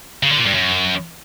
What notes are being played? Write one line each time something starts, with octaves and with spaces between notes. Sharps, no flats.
C#3
D3
A#2
G2
F#2